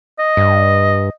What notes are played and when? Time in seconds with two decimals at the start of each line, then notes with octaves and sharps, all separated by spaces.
0.19 D#5
0.37 G2